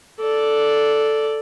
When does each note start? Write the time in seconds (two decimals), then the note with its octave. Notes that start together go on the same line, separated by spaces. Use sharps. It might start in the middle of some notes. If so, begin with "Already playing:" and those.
0.20 A4 D5